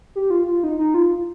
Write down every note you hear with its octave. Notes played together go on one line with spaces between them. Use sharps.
G4
F4
F4
D#4
D#4
F4